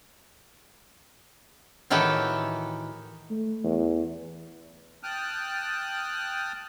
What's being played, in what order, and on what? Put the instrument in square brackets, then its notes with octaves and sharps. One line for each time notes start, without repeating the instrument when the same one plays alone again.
[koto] A2 D#3 E3 F#4 G4 A4
[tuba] A3
E2
[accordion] G5 A5 D#6 F6 F#6